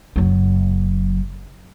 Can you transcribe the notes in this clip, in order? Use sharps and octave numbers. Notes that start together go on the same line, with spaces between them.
F#1 F#3